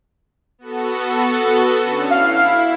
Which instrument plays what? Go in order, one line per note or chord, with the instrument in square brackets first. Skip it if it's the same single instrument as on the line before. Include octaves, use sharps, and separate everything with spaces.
[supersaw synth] B3 F#4 A4
D3 C#4
[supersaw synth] E4 [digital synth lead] F5